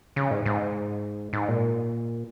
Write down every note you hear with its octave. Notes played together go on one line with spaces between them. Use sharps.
C#3
G#2
G#2
G#2
A#2